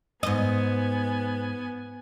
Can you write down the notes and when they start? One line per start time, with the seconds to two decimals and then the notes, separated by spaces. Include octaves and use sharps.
0.23 G#2 B3 D#5 G#5